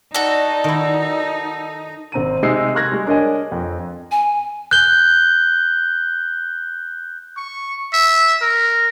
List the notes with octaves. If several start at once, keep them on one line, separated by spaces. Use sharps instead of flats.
D#4 F#4 A4 D5
D#3 E4
G#1 C4 A#5 D#7
C3 G#3 D#4 D#5 E6 C7
C6 C#6 F6 F#6 G#6 A#6
G3 G#3
D4 A#4 C#5 D#5 G#5
F2
G#5
F#6 G6 G7
C#6
E5
A#4